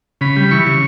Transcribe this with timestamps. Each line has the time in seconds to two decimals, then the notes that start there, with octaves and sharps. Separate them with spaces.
0.21 C#3 B5
0.36 G3
0.51 E3 C#6
0.67 C#3